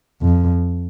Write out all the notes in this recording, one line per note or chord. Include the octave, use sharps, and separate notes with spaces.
F2